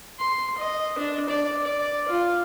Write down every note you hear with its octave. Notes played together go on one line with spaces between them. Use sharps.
C6
D#5
D4
D5
D5
F4